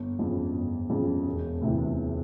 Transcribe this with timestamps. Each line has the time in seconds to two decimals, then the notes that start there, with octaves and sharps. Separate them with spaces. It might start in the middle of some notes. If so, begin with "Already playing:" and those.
Already playing: G1
0.19 F2 C#3
0.54 G1
0.90 F2 C#3
1.25 E1
1.62 D2 C3 E3
1.97 E1